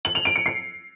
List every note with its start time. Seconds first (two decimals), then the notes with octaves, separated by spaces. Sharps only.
0.05 F#7
0.15 F7
0.25 D7
0.36 C#7
0.46 C7